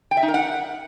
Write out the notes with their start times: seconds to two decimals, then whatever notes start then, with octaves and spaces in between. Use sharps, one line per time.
0.11 G5
0.17 E5
0.23 D#4
0.28 A#4
0.34 F#5